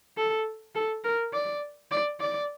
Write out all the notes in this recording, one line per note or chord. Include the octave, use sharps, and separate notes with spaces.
A4
A4
A#4
D5
D5
D5